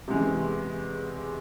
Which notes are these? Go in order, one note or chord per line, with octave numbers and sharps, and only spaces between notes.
E2 C3 E3 G#3